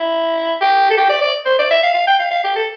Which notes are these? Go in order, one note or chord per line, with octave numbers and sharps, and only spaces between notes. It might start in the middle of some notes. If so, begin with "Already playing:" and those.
Already playing: E4
G4
A4
G4
D5
D5
C5
D5
E5
F5
F5
G5
F5
F5
G4
A4